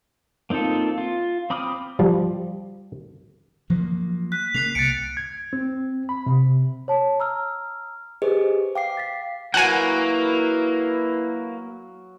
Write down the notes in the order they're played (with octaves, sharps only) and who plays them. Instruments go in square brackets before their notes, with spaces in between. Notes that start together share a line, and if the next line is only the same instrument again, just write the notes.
[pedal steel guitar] A#3 C4 D#4 F4 A4
F4
C4 B5 D6 D#6 F6
[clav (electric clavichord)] F3 G3
[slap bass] F3 F#3 A#3
[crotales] F#6 [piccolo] B6
[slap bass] C#3 A#3 [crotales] F#6 C7 F7
[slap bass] C2 [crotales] A6 D7 [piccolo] C#7
[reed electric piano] G#6
C4
B5
C3
[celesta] C#5 A5
A#5 E6 F6
[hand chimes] G4 G#4 D#5 [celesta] B4 C5
[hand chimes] F5 D6 C7 [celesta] G5
[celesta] A6 B6
[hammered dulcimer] F#3 F#4 [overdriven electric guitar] A#3 [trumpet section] E4 A#4 B4 [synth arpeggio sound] F#5 G#5